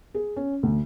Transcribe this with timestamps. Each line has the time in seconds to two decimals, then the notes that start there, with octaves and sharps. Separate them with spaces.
0.14 G#4
0.36 C#4
0.63 D2